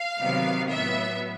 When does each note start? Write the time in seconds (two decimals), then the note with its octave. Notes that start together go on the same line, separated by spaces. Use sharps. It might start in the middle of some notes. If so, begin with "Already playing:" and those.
Already playing: F5
0.19 C3 D#3 F#3 B3
0.71 A2 F#3 B3 E5